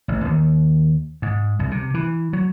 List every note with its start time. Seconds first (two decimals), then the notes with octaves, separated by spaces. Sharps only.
0.08 A1
0.25 D#2
1.22 G#2
1.59 C2
1.71 C3
1.94 E3
2.33 F#3